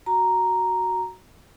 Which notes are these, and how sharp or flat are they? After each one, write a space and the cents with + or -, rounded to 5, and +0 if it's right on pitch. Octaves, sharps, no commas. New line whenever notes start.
F#4 +0 A#5 +0